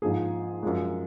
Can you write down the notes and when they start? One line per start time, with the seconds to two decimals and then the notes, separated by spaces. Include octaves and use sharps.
0.02 G#2 F3 A#3 G#4
0.63 F#2 F3 G#3